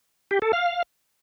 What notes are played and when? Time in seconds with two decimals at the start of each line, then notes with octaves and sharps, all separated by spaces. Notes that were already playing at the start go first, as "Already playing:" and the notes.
0.31 G4
0.42 A4
0.53 F5